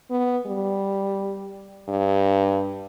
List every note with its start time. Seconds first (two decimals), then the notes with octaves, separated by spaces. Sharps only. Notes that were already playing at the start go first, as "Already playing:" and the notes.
0.10 B3
0.46 G3
1.89 G2